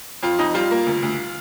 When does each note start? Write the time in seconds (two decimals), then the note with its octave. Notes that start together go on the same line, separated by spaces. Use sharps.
0.23 F2 F4
0.39 F2 D#4
0.54 G3 F4
0.71 A#3
0.87 D2
1.03 D2